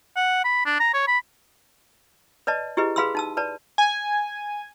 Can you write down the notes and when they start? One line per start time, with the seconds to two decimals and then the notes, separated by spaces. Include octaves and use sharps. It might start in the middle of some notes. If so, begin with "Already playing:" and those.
0.16 F#5
0.44 B5
0.65 D4
0.80 A#5
0.93 C#5
1.07 B5
2.47 B4 D5 D#5 A5
2.77 E4 G4 G#4 B4 D#5
2.96 G#4 B4 F5 B5 C6 E6
3.15 D#4 A5 E6
3.37 B4 D5 A5
3.78 G#5